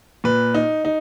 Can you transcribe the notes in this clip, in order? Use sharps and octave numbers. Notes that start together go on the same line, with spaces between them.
A#2 B4
D#4
D#4